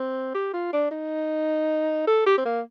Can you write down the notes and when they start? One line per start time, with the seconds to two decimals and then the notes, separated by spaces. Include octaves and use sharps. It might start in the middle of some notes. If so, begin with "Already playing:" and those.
Already playing: C4
0.34 G4
0.53 F4
0.73 D4
0.91 D#4
2.07 A4
2.26 G4
2.38 C4
2.45 A#3